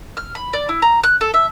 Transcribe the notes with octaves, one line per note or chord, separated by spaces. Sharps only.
F6
B5
D5
E4
A#5
F#6
A4
E5